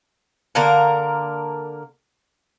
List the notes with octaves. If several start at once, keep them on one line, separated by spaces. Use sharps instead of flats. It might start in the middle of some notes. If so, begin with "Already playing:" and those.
D3 A#3 A#4